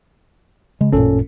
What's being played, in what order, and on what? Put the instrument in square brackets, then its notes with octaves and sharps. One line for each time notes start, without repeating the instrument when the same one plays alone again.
[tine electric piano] C#3 [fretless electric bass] G#3
[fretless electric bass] A1 F#2 A#2 [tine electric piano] C#4 A4